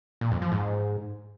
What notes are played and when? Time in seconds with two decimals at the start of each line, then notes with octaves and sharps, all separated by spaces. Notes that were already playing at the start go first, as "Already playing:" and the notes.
0.21 A#2
0.31 F2
0.42 F3
0.52 G#2